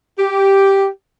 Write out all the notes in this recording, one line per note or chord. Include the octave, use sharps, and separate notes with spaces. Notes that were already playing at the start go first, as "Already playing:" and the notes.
G4